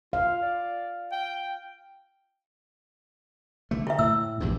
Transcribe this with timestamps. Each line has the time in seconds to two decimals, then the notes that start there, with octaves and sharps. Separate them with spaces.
0.13 F4 F5
0.42 D5
1.12 G5
3.71 D3 A3
3.87 E4 E5
3.99 A2 E6
4.40 A#1 E2 G2